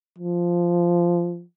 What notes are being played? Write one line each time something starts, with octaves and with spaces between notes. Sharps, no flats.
F3